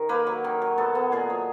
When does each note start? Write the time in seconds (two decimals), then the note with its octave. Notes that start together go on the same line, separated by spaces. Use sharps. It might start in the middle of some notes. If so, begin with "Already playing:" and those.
Already playing: D#3
0.09 A#3 B4
0.27 F#3
0.44 D#3
0.62 F#3
0.78 B3 A4
0.95 B3
1.12 A#2 G#4
1.30 F#3